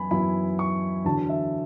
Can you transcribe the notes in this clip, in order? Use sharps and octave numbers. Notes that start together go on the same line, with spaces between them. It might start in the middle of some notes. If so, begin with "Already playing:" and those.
Already playing: F#2 E3 B3 E4 G#5 B5
F#2 E3 B3 E4 B5
C#6
E2 D3 F#3 A5
E5